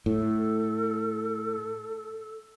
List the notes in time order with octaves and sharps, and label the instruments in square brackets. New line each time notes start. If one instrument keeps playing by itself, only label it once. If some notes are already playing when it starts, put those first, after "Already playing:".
[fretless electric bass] A2 [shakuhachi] A4